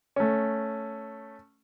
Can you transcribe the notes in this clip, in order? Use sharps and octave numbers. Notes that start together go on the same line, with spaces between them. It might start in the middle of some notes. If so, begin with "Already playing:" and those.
A3 C#4